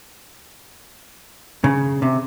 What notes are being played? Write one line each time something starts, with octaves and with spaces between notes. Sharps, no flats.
C#3
C3